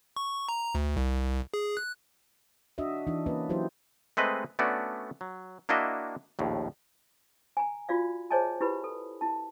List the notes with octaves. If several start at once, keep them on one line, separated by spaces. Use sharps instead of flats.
C#6
A#5
D2
C2
G#4
F#6
D4 F#4 D#5 E5
E3 D4 D#4
A#3 C#4 B4 D#5
E3 F#3 E4 G4 C5
G#3 A3 C4 B4 D#5
A3 B3 C#4 D4 F#4 D5
F#3
A#3 D4 E4 F#4 D#5 E5
A#1 D#2 A2
G#5 A#5
F4 F#4 D5 F5
G#4 C5 C#5 D#5 G#5 A5
E4 G4 B4 B5
A4
E4 A5